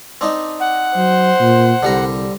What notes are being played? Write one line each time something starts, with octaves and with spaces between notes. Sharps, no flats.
C4 D4 D#4
F#5
F#3 C5
A#2
C2 D3 G3 A#5